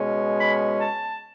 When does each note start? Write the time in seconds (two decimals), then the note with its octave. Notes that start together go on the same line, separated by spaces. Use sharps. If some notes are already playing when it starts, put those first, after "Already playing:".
Already playing: B2 G#3 C#4
0.39 B5
0.79 A5